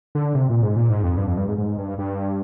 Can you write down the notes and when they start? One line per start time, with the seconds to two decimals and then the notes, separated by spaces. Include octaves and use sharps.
0.15 D3
0.35 C3
0.49 A#2
0.63 G#2
0.76 A#2
0.90 G#2
1.03 F2
1.17 G2
1.28 F2
1.37 G2
1.48 G#2
1.58 G#2
1.78 G2
1.98 G2